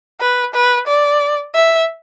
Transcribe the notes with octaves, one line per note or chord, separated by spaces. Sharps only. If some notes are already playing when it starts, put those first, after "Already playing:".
B4
B4
D5
E5